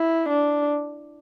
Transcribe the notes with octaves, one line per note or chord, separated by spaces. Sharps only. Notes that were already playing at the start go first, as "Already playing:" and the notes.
Already playing: E4
D4